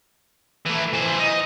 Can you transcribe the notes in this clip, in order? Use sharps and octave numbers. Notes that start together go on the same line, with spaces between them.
E3 A3
E3 C5
D#4